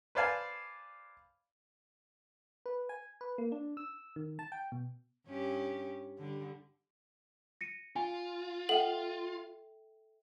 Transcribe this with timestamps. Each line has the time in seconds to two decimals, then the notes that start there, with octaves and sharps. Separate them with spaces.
0.15 B4 C5 D5 F5 G#5 A5
2.66 B4
2.89 G#5
3.21 B4
3.38 A#3
3.52 D4
3.77 E6
4.16 D#3
4.39 A5
4.52 G5
4.72 B2
5.27 G2 C#4 G4
6.18 D3 G3
7.61 A#6 C#7 D#7
7.96 F4 G#5
8.69 A4 E5 F#5 G5 F#7